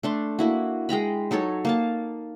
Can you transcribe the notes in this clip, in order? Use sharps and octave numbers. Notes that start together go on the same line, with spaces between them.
A3 D4 C6
A#3 E4 F#4
G#3 G5 A#5 B5
F#3 D#4 A4 C#5
A#3 F5 A5